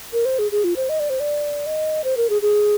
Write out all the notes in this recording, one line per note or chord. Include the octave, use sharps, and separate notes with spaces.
A#4
C5
G#4
G#4
F4
C5
D#5
D5
C5
D5
D#5
C5
A#4
G#4
G#4